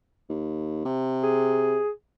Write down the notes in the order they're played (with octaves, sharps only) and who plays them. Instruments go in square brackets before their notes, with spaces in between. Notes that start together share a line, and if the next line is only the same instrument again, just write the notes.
[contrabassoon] D#2
C3
[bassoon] G#4